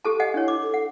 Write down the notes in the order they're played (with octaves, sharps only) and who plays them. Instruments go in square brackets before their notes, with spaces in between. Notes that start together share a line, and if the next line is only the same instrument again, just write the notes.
[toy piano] G4 A4 A5
D#5 F#5 G#5
[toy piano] D4 C#5 [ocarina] E4
[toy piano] D6
[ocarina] A4
[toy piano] F#5